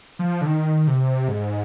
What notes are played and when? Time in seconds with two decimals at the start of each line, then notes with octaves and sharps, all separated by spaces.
0.19 F3
0.41 D3
0.46 D#3
0.88 C3
1.28 G#2